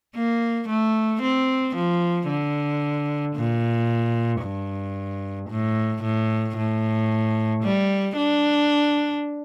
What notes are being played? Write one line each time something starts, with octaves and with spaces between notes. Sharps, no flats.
A#3
A3
C4
F3
D3
A#2
G2
A2
A2
A2
G3
D4